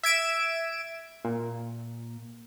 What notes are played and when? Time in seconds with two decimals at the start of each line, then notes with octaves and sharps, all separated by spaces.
0.03 E5 G#6 D7 E7
1.25 A#2